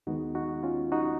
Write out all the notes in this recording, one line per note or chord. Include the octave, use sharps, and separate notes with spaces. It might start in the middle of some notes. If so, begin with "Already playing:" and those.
D#2 D#3 G#3 B3 D#4 F#4
D#4 F#4
C#4 F4
D#4 F#4